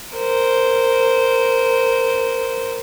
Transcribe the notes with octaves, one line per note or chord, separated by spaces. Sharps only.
A#4 C5